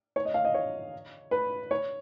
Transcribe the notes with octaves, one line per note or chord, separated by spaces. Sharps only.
C#5
D#5
F5
D#5
C#5
B4
C#5